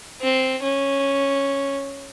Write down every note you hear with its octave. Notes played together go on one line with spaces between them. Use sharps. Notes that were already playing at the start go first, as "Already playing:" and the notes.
C4
C#4